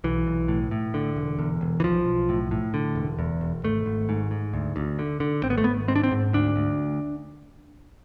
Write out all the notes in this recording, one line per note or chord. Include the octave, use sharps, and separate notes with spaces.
B1 E3
B1
A2
A2
D3
E1
E2
E1
E3
B1 F3
B1
A2
A2
D3
E1
E2
E1
G#1 A3
G#1
G#2
G#2
D2
D2
D3
D3
G#1 C4
B3
A3
G#1 B3
G#2 C4
D4
C4
G#2
D2 D4
D2